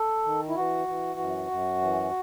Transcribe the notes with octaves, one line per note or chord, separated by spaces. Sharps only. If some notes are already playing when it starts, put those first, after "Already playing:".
Already playing: A4
D#3
E4
E3 F#4
E3
F#2
F#2
E3